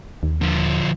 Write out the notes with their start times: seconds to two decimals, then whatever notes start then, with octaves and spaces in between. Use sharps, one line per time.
0.23 D#2
0.41 D3 F3